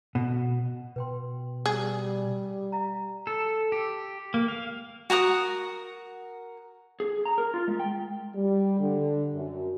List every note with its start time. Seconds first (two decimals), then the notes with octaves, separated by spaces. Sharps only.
0.15 B2
0.96 B2 B4 G5 C6
1.66 G3 G#4
2.72 E5 F5 A#5
3.27 A4
3.72 G4
4.34 A#3
4.48 F5
5.10 F#4 A#4 F#5 D#6
7.00 G#4
7.25 A#5
7.38 A#4
7.54 F4
7.68 G#3
7.79 G5
8.36 G3
8.81 D3
9.34 F#2